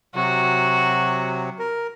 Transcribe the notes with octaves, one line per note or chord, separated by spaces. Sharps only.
C3 F#3 F#4
A#4